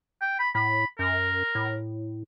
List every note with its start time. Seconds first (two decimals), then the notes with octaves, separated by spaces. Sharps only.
0.22 G5
0.39 B5
0.55 A2 B5
0.99 F#2 A#4
1.55 A2